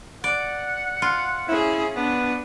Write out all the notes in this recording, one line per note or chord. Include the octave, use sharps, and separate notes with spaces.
D5 F#5
F4
C#4 E4 G#4
B3 D4 B4